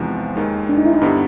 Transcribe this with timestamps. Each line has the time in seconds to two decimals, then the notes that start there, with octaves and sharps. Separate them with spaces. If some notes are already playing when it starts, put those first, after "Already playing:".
Already playing: E2 C3 F3 G#3 D#4
0.36 D#2 D#3 G#3
0.69 D4
0.78 D#4
0.85 E4
0.93 D#4
1.01 G2 D3 G3 B3